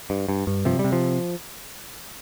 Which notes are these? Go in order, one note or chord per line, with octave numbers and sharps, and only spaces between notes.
G2
G2
G2
C3 F3
G3
C3
F3